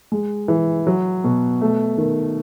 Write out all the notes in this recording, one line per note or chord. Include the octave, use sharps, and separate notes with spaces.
G#3
E3
F#3
B2
A3
D#3